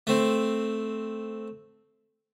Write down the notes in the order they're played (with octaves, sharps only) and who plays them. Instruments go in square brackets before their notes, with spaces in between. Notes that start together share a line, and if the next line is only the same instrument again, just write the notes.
[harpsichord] A3 C4